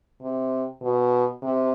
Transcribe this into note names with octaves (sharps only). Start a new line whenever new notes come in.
C3
B2
C3